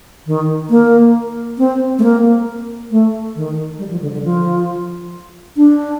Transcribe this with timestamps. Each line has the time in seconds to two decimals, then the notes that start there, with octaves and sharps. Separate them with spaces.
0.27 D#3
0.70 A#3
1.58 C4
1.99 A3
2.03 A#3
2.91 A3
3.36 D#3
3.79 G3
3.91 F3
4.02 D3
4.13 D3
4.24 F3
5.57 D4